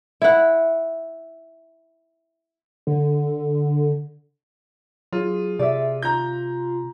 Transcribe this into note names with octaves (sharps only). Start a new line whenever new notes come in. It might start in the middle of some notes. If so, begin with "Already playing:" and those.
E4 F#5
D3
F#3 F4 G#4
C3 D5 E5
F4 A#5 G6